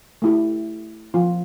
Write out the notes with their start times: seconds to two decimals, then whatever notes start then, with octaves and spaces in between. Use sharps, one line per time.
0.22 A3 E4 G4
1.14 F3 C4 F4